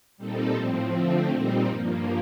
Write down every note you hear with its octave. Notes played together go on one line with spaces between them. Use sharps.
A#2 G3 C4 D#4 A4
A2 F3 C4
D3 F3 A3 C4
A#2 G3 C4 D#4
G2 F3 A#3